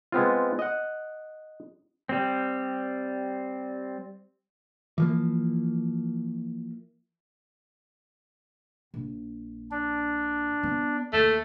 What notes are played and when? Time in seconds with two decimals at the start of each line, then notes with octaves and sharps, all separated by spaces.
0.12 G#3 B3 C4 F4
0.59 D#5 F#5
2.09 G3 C4
4.98 E3 F3 A#3
8.94 A#1
9.71 D4
10.63 B3
11.13 D#2 A3